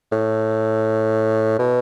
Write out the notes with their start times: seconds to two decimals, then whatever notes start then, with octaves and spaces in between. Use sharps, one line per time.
0.12 A2
1.59 B2